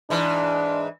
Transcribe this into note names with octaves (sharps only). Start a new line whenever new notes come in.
G#2 E3 D4